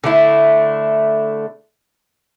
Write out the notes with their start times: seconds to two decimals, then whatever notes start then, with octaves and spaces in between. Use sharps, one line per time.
0.04 D3 A3 E4